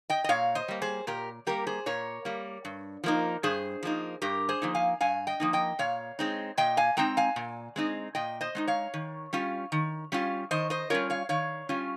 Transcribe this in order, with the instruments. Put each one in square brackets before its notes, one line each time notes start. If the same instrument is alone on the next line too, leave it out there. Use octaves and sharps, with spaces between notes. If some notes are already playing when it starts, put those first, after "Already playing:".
[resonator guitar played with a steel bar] D#5 G5
D#5
A#2 C#5 F5
C5 D#5
G3 A#3
G#4 C5
A#2 G4 A#4
G3 A#3 G4 A#4
G#4 C5
A#2 A#4 C#5
G3 A#3
G2
F3 A#3 D#4
G2 G#4 C5
F3 A#3 D#4
G2 G4 A#4
G#4 C5
F3 A#3 D#4
F5 G#5
G2 F5 G#5
D#5 G5
F3 A#3 D#4
D#5 G5
A#2 C#5 F5
G#3 C4 D#4
A#2 D#5 G5
F5 G#5
G#3 C4 D#4 G5 A#5
F5 G#5
A#2
G#3 C4 D#4
A#2 D#5 G5
C5 D#5
G#3 C4 D#4
C#5 F5
D#3
G3 C#4 F4
D#3
G3 C#4 F4
D#3 C5 D#5
C5 D#5
G3 C#4 F4 A#4 C#5
C#5 F5
D#3 C#5 F5
G3 C#4 F4